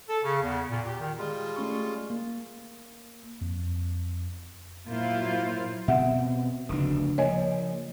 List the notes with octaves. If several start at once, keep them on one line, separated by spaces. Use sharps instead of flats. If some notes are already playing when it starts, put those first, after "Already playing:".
A4
C#3
E2
A#2
G4
D#3
G3 G#3 F4
A3 C#4 C#6
A#3
F2
A#2 F#3 A#3 E4 F4 C5
B2 C4 E5 F#5
F1 D2 C#3 D4
F3 A#3 C#5 D#5 G#5